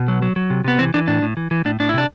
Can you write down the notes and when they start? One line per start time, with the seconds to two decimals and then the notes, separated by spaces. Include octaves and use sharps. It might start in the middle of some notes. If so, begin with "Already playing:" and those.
Already playing: B2
0.08 F#3
0.22 F#3
0.36 F#3
0.50 C3
0.64 C3 B3
0.79 E3 C4
0.94 E3 D4
1.08 A2 D4
1.22 A2
1.37 E3
1.51 E3
1.65 A2 D4
1.80 A2 D4
1.89 E4
1.94 C3 D4